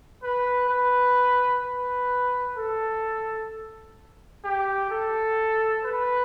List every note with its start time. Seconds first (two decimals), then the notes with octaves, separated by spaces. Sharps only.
0.23 B4
0.70 B4
1.63 B4
2.56 A4
4.44 G4
4.90 A4
5.84 B4